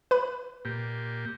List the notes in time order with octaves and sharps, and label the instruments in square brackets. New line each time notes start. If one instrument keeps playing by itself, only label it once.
[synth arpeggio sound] B4 B5
[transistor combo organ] A#2 G4